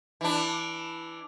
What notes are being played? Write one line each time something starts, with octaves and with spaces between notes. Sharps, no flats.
E3 D4